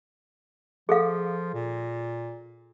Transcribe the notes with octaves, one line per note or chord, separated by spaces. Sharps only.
F3 G#4 A4 F5
A#2